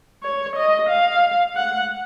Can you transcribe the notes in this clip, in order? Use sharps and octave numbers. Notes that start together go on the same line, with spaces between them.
C#5
D#5
F5
F#5